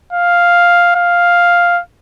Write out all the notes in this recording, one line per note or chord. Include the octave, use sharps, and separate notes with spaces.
F5
F5